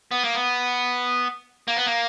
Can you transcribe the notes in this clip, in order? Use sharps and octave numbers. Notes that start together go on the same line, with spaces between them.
B3
A#3
B3
A#3
B3
A#3